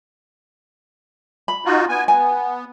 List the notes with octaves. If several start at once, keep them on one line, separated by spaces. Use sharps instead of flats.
B5
D#4 F4 F#4
B3 G#5
B3 G#5